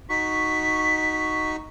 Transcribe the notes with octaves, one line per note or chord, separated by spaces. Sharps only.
D#4 F#4 C#6 B6